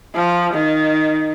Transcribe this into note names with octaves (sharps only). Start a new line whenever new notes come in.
F3
D#3